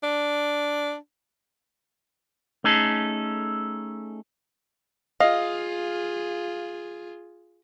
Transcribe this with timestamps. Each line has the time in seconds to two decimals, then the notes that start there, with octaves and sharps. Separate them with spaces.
0.03 D4
2.64 A3 C#4 D#4 G#4 A4
5.20 F4 G#4 D#5 F5